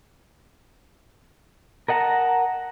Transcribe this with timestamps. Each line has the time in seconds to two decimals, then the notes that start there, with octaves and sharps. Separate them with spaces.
1.88 A#4 D#5 F#5 A5 A#5